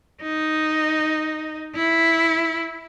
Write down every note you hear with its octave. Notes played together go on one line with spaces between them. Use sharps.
D#4
E4